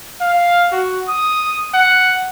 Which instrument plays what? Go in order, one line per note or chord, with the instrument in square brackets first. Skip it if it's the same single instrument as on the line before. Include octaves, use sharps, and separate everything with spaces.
[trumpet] F5
F#4
D#6
F#5